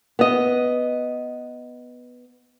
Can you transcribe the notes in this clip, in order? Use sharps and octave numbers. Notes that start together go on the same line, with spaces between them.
B3 D#5